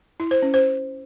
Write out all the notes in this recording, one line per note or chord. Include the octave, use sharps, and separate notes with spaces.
E4
C5
C#4
C5